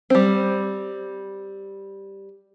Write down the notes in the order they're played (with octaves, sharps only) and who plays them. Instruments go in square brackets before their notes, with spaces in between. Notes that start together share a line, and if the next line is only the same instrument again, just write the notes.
[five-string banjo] G3 C4